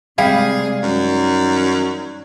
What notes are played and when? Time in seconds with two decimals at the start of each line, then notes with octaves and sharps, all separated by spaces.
0.18 C3 G3 G#3 G#4 F5
0.83 F#2 D#3